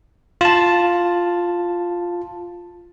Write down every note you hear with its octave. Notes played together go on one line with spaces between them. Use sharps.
F4 A5